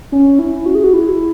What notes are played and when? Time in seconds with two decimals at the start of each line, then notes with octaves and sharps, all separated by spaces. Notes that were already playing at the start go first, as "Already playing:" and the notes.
0.12 C#4
0.39 E4
0.66 F#4
0.75 G#4
0.84 F#4
0.94 E4